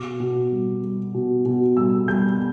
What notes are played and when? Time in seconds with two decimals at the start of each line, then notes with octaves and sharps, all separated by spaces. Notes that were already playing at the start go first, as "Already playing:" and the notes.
Already playing: B2 D6
0.20 B2
0.52 G3
0.83 G3
1.14 B2
1.46 B2
1.77 G3 E6
2.08 G3 G6